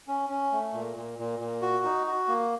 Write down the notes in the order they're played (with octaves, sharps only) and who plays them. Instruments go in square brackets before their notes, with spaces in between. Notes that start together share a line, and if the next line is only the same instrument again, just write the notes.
[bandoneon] C#4
C#4
A3
A#2
A#2
A#2
A#2
F#4
D#4
F#4
A#3